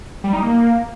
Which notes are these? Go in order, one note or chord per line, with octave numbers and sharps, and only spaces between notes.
G3
D#4
A#3